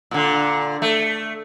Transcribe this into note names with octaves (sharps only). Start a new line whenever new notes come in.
A#2 D3
A3